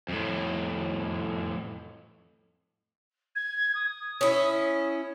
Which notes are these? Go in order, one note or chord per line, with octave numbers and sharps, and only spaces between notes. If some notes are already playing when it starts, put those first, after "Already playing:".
F2 A2
G#6
D#6
C#4 E4